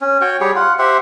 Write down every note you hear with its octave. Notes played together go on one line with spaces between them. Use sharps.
C#4
F#4 C#5 G5
G3 G4 G#4 C#5
F4 F#5
G4 C5 E5 F#5